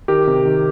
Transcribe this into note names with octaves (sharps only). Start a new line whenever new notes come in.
D#3 G4 A#4
C3
D#3